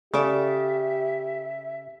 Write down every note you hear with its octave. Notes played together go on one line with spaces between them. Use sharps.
C#3 G4 A4 D5 E5